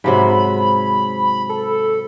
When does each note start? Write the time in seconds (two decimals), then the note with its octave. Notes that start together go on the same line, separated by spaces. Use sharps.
0.04 G#2 C3 F#3 B5
1.49 A4